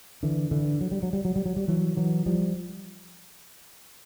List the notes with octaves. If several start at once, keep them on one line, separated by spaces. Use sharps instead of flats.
D3 E3
D3 E3
F#3
G3
F#3
G3
F#3
G3
F#3
G3
E3 F#3
E3 F#3
F3 G3